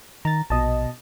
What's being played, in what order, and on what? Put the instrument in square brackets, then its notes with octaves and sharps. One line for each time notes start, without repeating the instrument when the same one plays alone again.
[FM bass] D#3 [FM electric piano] A#5 A6
[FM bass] A#1 [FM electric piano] B2 D#5 A5